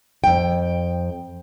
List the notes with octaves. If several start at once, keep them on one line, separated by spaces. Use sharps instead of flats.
F2 G5